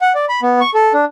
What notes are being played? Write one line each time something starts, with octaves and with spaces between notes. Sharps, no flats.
F#5
D5
B5
B3
C#6
A4
D4